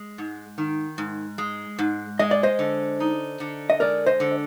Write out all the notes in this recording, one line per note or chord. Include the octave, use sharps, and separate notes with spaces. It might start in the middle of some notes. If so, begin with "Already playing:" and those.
Already playing: G#3
G#2
D#3
G#2
G#3
G#2
G#3 D#5
D5
C5 D#5
D3
D#4
D3
D#5
G#3 A#4 D5
C5 D#5
D3